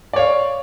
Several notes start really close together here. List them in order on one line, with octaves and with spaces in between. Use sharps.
D5 C#5 F5